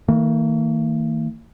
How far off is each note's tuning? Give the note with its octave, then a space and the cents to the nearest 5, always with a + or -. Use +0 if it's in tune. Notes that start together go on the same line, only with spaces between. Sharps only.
D#3 +40 A#3 -45